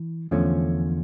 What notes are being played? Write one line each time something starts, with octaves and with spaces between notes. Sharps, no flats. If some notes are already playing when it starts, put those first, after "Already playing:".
Already playing: E3
E2 D3 F3 A3 C#4